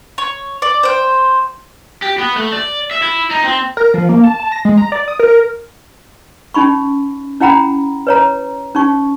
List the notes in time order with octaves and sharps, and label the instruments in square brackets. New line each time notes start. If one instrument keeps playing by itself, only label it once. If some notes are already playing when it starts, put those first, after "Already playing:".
[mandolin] C#5
D5
C5 G5
[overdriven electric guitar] G4
B3
A3
D5
E5
E4
D#4
C4
[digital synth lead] A#4
F3
A#3
A5
A5
A#6
G#3
A#5
D5
D#6
A#4
[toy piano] C#4 D#4 B5 C#6
C#4 E4 F#5 G5 A#5 B5
B4 C#5 A#5
C#4 D#4 C#6